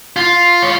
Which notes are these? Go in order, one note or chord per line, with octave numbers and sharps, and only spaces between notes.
F4
C#5